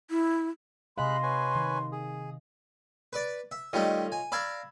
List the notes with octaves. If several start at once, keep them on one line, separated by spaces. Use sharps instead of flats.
E4
C3 G#3 D#5 F5 B5 C6 F#6
B4 C#5 G#5
D#3
G#4
B4 D5
E5
D#3 G3 A3 F4 C#5 D#5
G#5
D5 F5 A#5 B5 E6 G#6